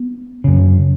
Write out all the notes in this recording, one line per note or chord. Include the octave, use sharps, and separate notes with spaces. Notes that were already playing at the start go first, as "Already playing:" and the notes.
Already playing: B3
F#2 C#3